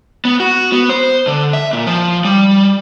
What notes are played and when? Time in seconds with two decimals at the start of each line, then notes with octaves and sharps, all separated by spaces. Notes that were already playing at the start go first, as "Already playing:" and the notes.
0.25 B3
0.40 F#4
0.72 B3
0.90 C5
1.27 D3
1.53 E5
1.73 A#2
1.87 F3
2.25 G3